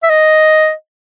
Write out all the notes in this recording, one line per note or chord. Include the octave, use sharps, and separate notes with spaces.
E5
D#5